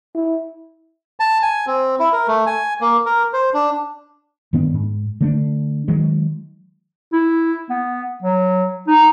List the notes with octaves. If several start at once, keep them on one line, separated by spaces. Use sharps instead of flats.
E4
A5
G#5
C4
E4
A#4
A3
G#5
A#3
A#4
C5
D4
G2 D#3 B3 D4
G#2
D3 A3 C4 D4
D#3 F#3 G#3
E4
B3
F#3
D#4